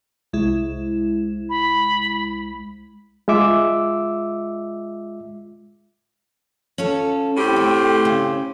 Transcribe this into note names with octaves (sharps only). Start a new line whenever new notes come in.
C2 G#3 E4
B5
G#3 F4 E5 D6 E6
C#4 F4 A4
A2 C4 G4
A3
C#3